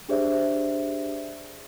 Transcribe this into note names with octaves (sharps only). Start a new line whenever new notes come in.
D4 G4 G#4 C5 D5 E5